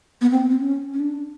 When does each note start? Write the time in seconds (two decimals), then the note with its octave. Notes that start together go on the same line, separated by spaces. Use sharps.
0.21 B3
0.31 C4
0.50 C4
0.60 C#4
0.93 C#4
1.00 D4